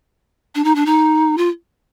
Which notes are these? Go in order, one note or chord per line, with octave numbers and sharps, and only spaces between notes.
D4
D#4
D4
D#4
F4